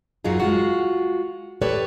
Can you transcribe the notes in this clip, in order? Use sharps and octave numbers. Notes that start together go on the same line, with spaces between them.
F#2 F#3 D#4 F4 G#4
G#3 F4 F#4
G4 A4 B4 C#5 D5